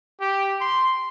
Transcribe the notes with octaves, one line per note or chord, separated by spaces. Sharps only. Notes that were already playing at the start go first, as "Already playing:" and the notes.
G4
C6